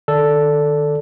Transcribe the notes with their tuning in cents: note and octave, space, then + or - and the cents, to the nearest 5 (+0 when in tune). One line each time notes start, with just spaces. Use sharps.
D#3 -35 A4 +0 D5 -10